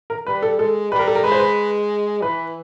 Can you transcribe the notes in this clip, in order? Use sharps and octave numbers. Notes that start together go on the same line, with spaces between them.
A#4
G3 B4
A4
G#3 A4
G3 B4
A#4
A4
A#4
G#3 B4
C5
B4
E3 B4